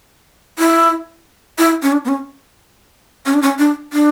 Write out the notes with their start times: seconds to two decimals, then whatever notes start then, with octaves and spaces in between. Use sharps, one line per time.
0.59 E4
1.59 E4
1.82 C#4
1.92 D4
2.05 B3
2.08 C#4
3.26 C#4
3.34 D4
3.42 C#4
3.59 D4
3.93 D4